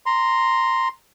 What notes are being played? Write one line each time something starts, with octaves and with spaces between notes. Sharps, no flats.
A#5 C6